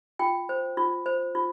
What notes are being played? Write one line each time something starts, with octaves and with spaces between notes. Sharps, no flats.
F4 G5
C5
F4
C5
F4